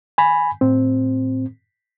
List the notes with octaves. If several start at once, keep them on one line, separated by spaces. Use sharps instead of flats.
G#5 B5
A2 C4